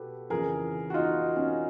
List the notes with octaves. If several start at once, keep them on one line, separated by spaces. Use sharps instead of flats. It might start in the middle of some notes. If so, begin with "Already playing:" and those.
Already playing: B2 F#4 G4 A4 B4
F2 C#3 E3 G#4 A#4
F#4
D#4 F4
C#4 D#4